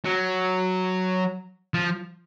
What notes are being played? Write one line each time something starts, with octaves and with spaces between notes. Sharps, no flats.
F#3
F3